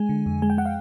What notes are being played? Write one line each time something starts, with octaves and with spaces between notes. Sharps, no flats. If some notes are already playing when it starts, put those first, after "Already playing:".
Already playing: G#3 G#5
D3
F2
G#3 G#5
G5
G#3 F#5
F5